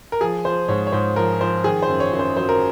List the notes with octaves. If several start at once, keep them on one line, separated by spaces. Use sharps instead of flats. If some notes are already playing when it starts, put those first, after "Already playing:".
A#4
F3 G#4
F3 C5
G#2 C#5
C#5
G#2 C5
F3 A#4
F3 C5
D#3 G#4
C5
F#2
C#5
F#2
C5
F#3 C5
A#4